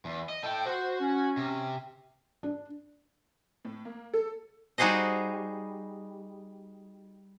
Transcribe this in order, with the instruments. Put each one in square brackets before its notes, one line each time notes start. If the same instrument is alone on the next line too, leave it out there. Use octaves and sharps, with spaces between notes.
[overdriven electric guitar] E2
D#5
[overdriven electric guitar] E4 A4 [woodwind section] G5
[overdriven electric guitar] F#4 [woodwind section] C5
[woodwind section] C#4
[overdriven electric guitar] C3
[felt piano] D4
[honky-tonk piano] A2
A#3
A4
[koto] G3 D#4 F#4 G#4 C5 D#5